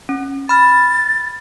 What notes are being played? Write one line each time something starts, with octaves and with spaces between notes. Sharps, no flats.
C#4
B5 F6 A6